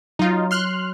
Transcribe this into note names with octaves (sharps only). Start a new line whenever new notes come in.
F#3 D#4 F4
C6 F6 F#6